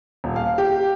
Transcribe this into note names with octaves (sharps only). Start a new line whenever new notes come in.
D#1
F5
G4